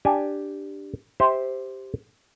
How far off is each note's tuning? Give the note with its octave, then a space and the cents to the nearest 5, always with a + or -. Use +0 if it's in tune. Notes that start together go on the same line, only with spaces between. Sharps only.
D4 +0 G4 +0 G#5 +0
G4 +0 C5 +0 E5 -20